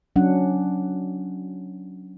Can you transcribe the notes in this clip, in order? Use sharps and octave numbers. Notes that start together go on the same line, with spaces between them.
F#3 C#4 D4 F#5